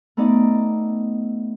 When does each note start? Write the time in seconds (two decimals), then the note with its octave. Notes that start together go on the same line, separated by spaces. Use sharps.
0.17 A3 B3 D#4 D5 D#5